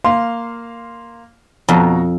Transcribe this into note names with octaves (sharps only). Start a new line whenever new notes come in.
A#3 F5 C6
F2 B2 F#4 A#5